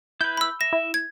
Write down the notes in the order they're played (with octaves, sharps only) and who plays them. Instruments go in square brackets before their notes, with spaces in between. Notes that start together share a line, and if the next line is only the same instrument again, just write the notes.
[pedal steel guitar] E4 B4 [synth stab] G6
[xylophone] B5 E6
[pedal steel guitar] E5 [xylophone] A#6
[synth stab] E4
[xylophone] G#6